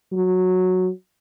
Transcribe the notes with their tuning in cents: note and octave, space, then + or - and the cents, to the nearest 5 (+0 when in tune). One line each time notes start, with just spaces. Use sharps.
F#3 -10